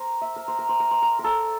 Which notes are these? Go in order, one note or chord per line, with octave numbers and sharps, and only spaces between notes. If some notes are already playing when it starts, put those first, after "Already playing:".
Already playing: A#4 C5
E5
A#4
C5
A#4
C5
A#4
C5
A#4
A#4
A4